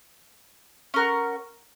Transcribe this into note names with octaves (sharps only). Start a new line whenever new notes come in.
C#4 A#4 F#5